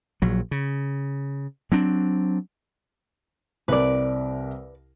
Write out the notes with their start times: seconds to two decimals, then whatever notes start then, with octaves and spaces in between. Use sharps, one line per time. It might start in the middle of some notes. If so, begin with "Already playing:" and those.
0.22 A#1 F#3
0.51 C#3
1.72 F#3 C4 D4
3.68 C2 C3 A#4 B4 D5